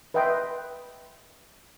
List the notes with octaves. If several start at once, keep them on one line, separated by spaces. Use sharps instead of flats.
B4 D#5 E5 G5 C6